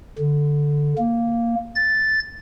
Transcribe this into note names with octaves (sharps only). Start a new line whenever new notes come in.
D3
A#3
A6